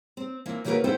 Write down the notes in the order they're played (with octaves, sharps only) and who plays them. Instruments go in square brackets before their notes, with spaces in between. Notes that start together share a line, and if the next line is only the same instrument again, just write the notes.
[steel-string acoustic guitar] C4
E3 A#3 C4 F4
C#3 E3 A#3 F#4 A#4 B4
B3 C4 E4 F4 A4 C5